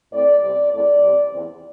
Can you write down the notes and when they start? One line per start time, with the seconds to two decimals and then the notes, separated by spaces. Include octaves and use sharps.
0.13 A2 A3 C4 D5
0.42 C3 G3 C4 D5
0.72 E2 E3 A3 C4 D5
1.02 C3 G3 C4
1.31 E2 E3 C4